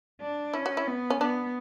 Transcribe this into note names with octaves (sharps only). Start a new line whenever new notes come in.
D4
C#4 E4
F#4
E4
B3
C#4
B3 D4